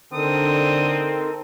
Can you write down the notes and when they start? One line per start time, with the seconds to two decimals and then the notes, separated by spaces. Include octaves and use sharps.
0.13 D3 C4 D#4 A4 A#4 D#6